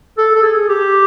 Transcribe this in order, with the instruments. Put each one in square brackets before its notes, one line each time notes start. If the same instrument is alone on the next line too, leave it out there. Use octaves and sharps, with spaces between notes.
[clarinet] A4
A4
G#4
G4